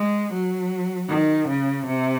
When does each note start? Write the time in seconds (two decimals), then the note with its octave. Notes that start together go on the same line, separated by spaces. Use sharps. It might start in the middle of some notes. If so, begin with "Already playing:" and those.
Already playing: G#3
0.33 F#3
1.09 D#3
1.48 C#3
1.86 C3